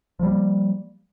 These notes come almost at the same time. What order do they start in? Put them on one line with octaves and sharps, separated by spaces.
F3 G3 A#3